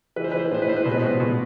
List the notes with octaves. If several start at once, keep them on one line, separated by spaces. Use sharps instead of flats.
E3 B4
C5
E3 B4
C5
B4
A2 C5
B4
A2 C5
B4
B2 C5
B4
C5
B2 B4
B2